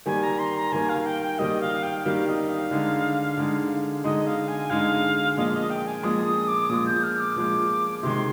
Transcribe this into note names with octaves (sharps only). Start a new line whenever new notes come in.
D#3 G3 A#3 G#5
A#5
C6
A#5
D#3 G3 A#3 G#5
F5
G5
G5
D#3 G3 A#3 D#5
F5
G5
D#3 G3 A#3 F5
D#5
F5
D3 G#3 D#4
D3 G#3 D#4
D3 G#3 D#4 D#5
F5
G#5
D3 G#3 D#4 F5
A#2 F3 G#3 D#5
D#5
G5
G#5
A#2 F3 G#3 D#6
D#6
D6
A#2 F3 G#3 D#6
G6
F6
D6
A#2 F3 G#3
C3 D#3 G#3 C6